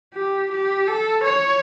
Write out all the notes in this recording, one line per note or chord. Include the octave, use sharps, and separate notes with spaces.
G4
G4
A4
C#5